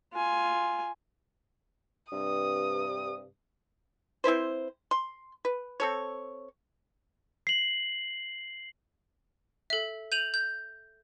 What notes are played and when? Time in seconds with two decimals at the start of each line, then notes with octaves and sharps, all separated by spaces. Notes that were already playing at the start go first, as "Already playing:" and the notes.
0.14 F4 G#5
2.12 G2 C3 D#6
4.24 C4 E4 B4 C5
4.91 C6
5.45 B4
5.80 C4 A4 C#5
7.47 C7 F#7
9.70 A4 E5
10.12 G6 D#7 F7 F#7
10.34 G6